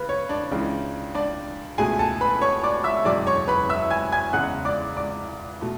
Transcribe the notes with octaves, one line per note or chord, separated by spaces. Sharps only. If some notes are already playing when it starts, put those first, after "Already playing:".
Already playing: C#3 B4
C#5
D4 D5
C#2 C#3 E3 G#3
D4 D5
C#2 B2 A3 G#4 G#5
A4 A5
B4 B5
C#5 C#6
D5 D6
E5 E6
F#1 E2 B2 G#3 D5 D6
C#5 C#6
B4 B5
E5 E6
G#5 G#6
G#5 G#6
E2 C#3 G#3 F#5 F#6
D5 D6
D5 D6
B2 A3